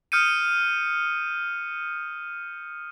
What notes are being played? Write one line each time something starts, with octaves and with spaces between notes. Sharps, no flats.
D#6 F6 G6 C#7 D#7